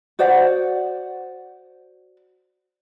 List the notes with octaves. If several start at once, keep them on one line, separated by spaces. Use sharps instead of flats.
F#4 C5 D5 F#5